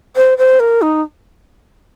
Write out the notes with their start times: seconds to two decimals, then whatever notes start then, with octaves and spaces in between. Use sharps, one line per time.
0.16 C5
0.38 C5
0.60 A#4
0.82 D#4